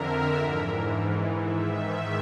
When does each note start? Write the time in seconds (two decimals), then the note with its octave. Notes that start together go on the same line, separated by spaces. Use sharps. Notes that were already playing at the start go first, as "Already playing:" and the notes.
Already playing: F2 D3 A#4 E5
0.36 G#2 E3
1.42 G#2 D#3 E5